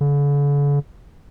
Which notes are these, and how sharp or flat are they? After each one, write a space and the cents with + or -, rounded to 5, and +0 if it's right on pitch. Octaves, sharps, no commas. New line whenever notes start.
D3 -45